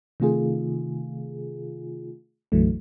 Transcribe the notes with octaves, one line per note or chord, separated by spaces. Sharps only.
C3 D#3 A3 F4 G#4
B1 F#2 D3 E3 F#3 A3